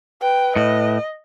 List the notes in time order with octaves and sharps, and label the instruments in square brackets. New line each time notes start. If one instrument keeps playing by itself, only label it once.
[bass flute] B4 [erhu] G5
[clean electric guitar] A2 [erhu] D#5